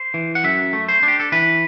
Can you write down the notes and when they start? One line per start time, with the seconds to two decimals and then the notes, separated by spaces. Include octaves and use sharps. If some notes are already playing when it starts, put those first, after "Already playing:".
Already playing: C5
0.14 E3
0.35 F#5
0.44 F#2 E5
0.73 A3
0.89 C5
1.03 D4
1.08 G4
1.20 A4
1.32 E3 B4